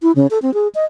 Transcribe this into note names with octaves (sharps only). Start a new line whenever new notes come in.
E4
C#3
A4
C4
G#4
D#5